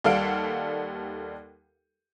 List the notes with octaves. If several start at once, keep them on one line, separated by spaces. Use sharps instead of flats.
D#2 G3 A4 F5 F#5 D7